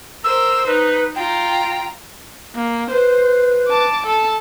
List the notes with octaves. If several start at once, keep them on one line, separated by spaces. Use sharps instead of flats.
A#4 C5 E6
D#4 B4
F4 G5 A#5
A#3
B4 C5
A5 D6
A4 A5